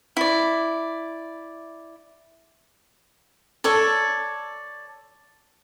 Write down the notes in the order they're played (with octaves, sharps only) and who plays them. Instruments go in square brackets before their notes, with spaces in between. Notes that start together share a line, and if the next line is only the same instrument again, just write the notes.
[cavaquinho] E4 D5
A4 C#5 D5